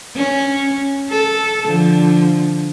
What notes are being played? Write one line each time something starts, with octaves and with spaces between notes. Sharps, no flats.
C#4
A4
D3 F3